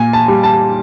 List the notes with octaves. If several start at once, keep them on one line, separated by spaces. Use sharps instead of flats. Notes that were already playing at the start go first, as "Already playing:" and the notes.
Already playing: A#2 G#5
A5
G3
A5